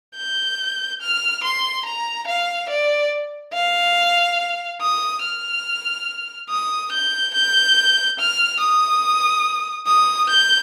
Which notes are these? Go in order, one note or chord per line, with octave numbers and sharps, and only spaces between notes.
G6
F6
C6
A#5
F5
D5
F5
D#6
F6
D#6
G6
G6
F6
D#6
D#6
G6